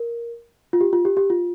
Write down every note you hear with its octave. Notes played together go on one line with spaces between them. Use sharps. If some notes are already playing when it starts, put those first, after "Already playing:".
Already playing: A#4
F4
G4
F4
G4
G4
F4